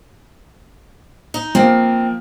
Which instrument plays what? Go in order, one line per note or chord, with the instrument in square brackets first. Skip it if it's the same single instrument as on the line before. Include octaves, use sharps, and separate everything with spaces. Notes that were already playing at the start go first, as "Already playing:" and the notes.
[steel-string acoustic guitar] D#4
[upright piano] F3 A#3 [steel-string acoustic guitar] C4